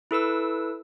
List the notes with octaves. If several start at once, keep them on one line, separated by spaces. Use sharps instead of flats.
E4 A4 B4 E6